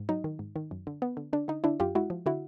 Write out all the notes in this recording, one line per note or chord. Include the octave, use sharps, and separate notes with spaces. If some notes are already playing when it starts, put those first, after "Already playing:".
Already playing: G#2
F#3 D#4
D#3
G#2
D#3
F#2
D3
B3
D3
D3 D4
D3 D#4
D3 D4 E4
F#2 F4 G4
G#3 E4 F#4
F3
D3 E4 F#4